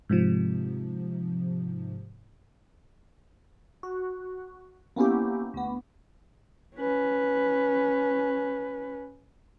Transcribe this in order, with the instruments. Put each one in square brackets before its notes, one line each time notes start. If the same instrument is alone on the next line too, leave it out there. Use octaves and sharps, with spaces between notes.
[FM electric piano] G#2 C3 F3
[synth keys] F#4
A#3 B3 C#4 E4 G4
D2 B3
[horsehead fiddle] C#4 B4